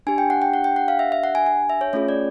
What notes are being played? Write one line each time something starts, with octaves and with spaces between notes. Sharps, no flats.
D4 G4 G#5
G5
F#5
G5
F#5
G5
F#5
F5
E5
E5
F#5
G#5
G#5
E5
C#5
A3 C#4 F4 G#4 C#5
D5